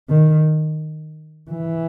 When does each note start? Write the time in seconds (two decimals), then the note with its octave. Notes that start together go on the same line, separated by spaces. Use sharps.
0.10 D#3
1.51 E3